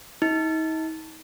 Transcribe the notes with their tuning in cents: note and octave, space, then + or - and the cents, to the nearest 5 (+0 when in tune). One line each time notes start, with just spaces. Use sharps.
D#4 +40